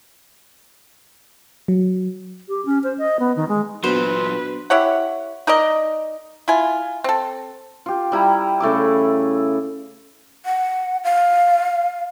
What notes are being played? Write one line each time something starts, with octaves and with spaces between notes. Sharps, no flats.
F#3
G4
C#4
C5
D#5
B3
D#3
G#3
A#2 F#3 B3 D4 F#4 B4 C5
E4 G4 C#5 F#5
D#4 A#4 D5 D#5
E4 F4 G#5
C4 A4
F4 G4
G3 E4 A#5
C#3 A3 E4 D6
F#5
F5